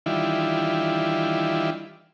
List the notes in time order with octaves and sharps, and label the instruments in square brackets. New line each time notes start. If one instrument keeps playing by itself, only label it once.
[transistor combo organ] D#3 E3 G3 D4 E4 F4